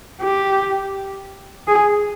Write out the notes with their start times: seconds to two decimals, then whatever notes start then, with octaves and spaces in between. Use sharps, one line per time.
0.21 G4
1.67 G#4